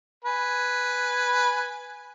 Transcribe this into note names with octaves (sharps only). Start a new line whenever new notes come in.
B4 G#5